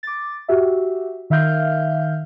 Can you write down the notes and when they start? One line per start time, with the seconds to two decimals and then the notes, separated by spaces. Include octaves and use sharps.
0.03 D6 A6
0.48 F#4 G4 E5
1.30 D#3 E5 F5 F6 G6